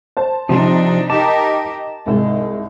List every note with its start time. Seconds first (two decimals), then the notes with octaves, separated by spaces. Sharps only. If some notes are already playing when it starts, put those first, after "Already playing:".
0.17 C5 A5
0.49 C3 F3 D4 D#4
1.10 D#4 G4 A#4 A5 D6
2.06 C2 G#2 G#3